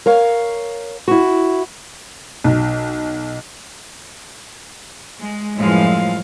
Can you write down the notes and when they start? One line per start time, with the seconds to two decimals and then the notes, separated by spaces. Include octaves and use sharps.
0.06 A#4 C#5 F5
1.08 E4 F#4
2.44 B1
5.19 G#3
5.57 F#2 A2 E3 F3 G#3 F5